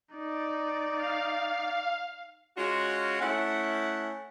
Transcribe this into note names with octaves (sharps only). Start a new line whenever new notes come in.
D#4 D5
F5
G#3 C#4 F4 F#4
A3 C#4 E4 F#5